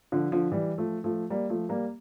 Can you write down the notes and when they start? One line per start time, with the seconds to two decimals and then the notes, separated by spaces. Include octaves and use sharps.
0.12 D3 F3
0.32 D3 F3
0.51 E3 G3
0.78 F3 A3
1.04 F3 A3
1.30 G3 A#3
1.50 F3 A3
1.69 G3 A#3